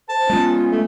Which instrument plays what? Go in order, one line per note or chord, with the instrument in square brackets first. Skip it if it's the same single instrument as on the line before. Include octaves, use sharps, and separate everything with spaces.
[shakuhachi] C5 [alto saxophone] A5
[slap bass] G#3 B3 [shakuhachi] C#4 [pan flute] F4
[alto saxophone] A3